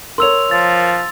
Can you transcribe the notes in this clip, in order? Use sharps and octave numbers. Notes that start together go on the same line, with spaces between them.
A#4 C#5 C6 E6 F7
F3 A6